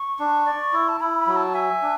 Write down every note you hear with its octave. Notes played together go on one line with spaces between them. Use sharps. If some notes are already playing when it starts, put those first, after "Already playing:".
Already playing: C#6
D4
D5
E4
A5
E4 B5
B5
F#3
A5
E5 G#5
D4